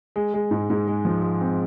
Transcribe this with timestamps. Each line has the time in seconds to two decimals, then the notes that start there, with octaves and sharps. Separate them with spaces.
0.16 G#3
0.34 G#3
0.51 G#2
0.70 G#2
0.88 G#3
1.05 F3
1.22 G#3
1.41 C4